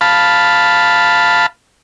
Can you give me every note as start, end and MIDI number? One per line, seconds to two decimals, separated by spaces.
0.01 1.46 77
0.01 1.46 81
0.01 1.46 83